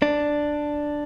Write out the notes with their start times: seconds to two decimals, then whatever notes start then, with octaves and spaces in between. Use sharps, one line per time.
0.02 D4